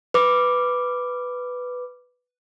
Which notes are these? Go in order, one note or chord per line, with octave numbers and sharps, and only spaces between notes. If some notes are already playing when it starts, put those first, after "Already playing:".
B4 D6